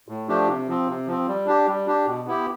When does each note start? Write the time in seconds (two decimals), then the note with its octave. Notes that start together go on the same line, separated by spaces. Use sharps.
0.08 A2
0.28 F3 A3 D4 G4
0.48 C3
0.68 F3 C4
0.88 C3
1.07 F3 C4
1.28 G3
1.46 D4 G4
1.67 G3
1.86 D4 G4
2.06 B2
2.27 B3 E4 G4